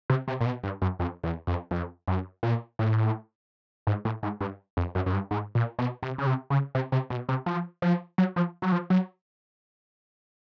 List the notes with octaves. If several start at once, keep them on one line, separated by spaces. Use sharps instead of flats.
C3
C3
A#2
B2
G2
F#2
F2
E2
F2
F2
F#2
A#2
A2
G#2
A2
G#2
G2
F2
F#2
F#2
G2
G#2
A#2
B2
C3
C#3
C3
C#3
C3
C3
B2
C3
F3
F3
F#3
F3
F#3
F3
F#3